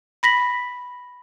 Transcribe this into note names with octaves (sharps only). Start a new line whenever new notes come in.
B5 A#6 B6 F#7